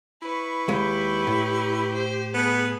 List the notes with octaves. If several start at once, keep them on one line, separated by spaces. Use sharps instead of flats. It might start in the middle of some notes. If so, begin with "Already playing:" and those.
E4 B4 C#6
D#2 G#3 G4
A2
C5
B3 G#4 A4 B4